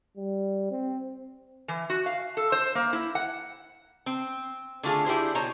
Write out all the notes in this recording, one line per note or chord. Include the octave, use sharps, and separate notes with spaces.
G3
C4
E3
F#4
F5
A4
C5
A#3
E4
F#5
C4
D3 A3 F4 G#4
D4 E4 G4 G#4 C5
B2 C5 C#5 A#5